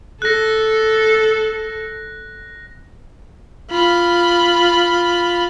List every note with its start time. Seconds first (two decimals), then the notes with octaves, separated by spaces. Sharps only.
0.22 A4 F#6 A#6
3.71 F4 B5